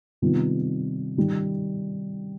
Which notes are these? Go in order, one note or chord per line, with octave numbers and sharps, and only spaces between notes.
C3 D#3 G3 B3 F4
D#3 G3